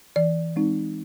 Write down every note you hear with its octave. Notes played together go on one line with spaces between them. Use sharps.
E3 D5
G#3 C4 D#4